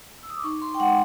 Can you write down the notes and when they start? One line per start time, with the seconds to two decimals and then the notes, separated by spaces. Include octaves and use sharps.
0.23 E6
0.30 D#6
0.37 D6
0.44 D#4 C#6
0.62 C6
0.75 G5
0.80 G#3 F#5